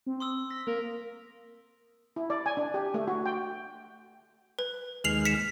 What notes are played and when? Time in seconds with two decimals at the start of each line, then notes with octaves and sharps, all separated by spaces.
0.06 C4
0.20 C6 D#6 E6
0.50 A#6 B6
0.67 A#3 A#4
2.16 E4
2.30 D5
2.46 G#5
2.57 D4
2.74 G4
2.94 A3
3.08 F#4
3.26 G5
4.59 B4
5.04 D#2 G#3 F6 C7 F7 F#7
5.25 B6 C#7 E7